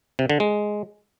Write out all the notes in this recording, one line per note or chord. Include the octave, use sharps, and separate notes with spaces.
C3
D3
G#3